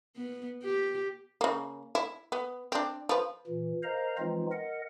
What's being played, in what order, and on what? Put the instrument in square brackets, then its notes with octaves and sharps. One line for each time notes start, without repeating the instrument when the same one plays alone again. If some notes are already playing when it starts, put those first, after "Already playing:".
[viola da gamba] B3
G4
[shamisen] C#3 A#3
E4
B3
C4 D4
F3 B4
[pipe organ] A#2 E3
A#4 C5 D#5 F5 A#5
E3 F3 G#3 C4 D#4 F4
A#4 D#5 F#5